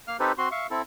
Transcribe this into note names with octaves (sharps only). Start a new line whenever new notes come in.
A#3 F5 F6
C4 D#4 G4 A4 B4 C5
C4 F#4 C6
E5 F5 C#6
C4 E4 A4